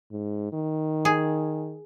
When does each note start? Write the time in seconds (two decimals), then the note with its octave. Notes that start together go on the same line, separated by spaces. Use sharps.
0.12 G#2
0.53 D#3
1.05 G#4